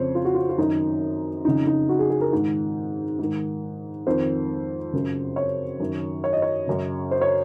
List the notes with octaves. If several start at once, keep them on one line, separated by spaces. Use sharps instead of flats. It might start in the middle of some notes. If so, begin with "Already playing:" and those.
Already playing: F2 C#3 C5 C#5
F4
F#4
F4
F4
F#2 D#3 D#4
F2 C#3 D#4
D#4
F#4
G#4
G#4
A#4
G#2 D#3
G#2 D#3
F2 D#3 C5
F#2 C#3
C#5
F#2 D#3
C#5
D#5
C#5
F#2 C#3
C5
C#5